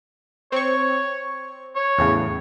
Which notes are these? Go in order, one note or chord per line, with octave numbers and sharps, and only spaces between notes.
C4 C#5 C#6
C#5
E2 A2 C#3